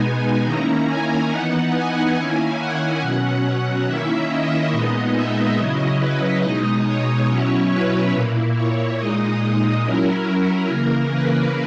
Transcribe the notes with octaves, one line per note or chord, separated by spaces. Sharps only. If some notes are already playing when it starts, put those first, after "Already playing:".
Already playing: B2 G#3 B3 D#4 G#5
D#3 A#3 C#4 E4 A#5
G#5
E3 B3 D#4 F#5
G#5
D#3 A#3 C#4 E4
F#5
B2 F#3 C#4
D#3 A#3 C#4 E4 E5
D#5
A#2 G#3 B3 D#4
E5
C#3 F#3 C#4 E4 D#5
B4
B2 G#3 D#4 D#5
C#5
B2 F#3 C#4 E4 C#5
B4
A#2 A#3 E4
C#5
A#2 G#3 D#4 D#5
F#3 C#4 E4 A#4
C#3 E3 A#3
B4